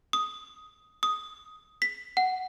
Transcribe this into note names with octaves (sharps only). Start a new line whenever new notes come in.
D#6
D#6
B6
F#5